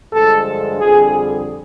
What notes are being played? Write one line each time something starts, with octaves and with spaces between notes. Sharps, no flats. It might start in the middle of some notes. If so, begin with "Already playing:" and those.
G2 D3 F3 G#3 A4
F2 D3 G3 G#4